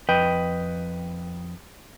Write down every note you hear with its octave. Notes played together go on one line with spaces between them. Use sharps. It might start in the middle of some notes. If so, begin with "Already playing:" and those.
F2 B4 D#5 G5